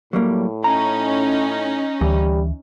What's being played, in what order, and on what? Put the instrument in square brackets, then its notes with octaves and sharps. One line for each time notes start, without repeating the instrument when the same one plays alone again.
[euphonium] A2 [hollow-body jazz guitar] F#3 G3 A#3
[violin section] C#4 D#4 [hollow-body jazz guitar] A#5
[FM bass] D2 [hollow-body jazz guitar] E3 [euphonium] G3